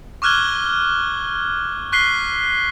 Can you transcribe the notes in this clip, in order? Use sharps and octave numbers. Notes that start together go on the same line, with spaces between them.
C#6 D6 F6 F#6 G#6 G7
C#6 F#6 B6 C7 G7